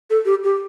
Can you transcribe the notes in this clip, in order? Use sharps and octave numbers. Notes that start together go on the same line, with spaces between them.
A4
G4
G4